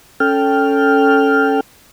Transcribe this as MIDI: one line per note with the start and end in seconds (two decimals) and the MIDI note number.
0.20 1.60 61
0.20 1.60 69
0.20 1.60 79
0.20 1.60 89